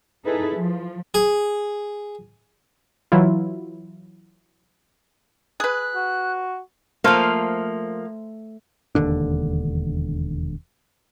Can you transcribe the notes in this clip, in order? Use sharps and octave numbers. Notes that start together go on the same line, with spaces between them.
D#4 E4 G#4 A4 B4
F3
G#4
E3 F#3 E4 F4
G#4 B4 F#6
F#4
F3 A3 A#3 C5 F5
E1 D#2 D3 D4